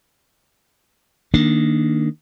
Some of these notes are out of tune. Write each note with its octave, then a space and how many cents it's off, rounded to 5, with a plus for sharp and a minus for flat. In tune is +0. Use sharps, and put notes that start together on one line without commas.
D#3 +0 A#3 +0 D4 +0